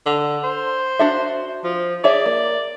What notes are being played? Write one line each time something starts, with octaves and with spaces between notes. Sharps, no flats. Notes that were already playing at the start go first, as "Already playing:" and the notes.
D3
C5
D4 F#4 E5
F3
G#4 C#5 D5 E5
A#3